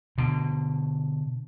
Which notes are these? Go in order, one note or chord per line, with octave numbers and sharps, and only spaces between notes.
B2 D3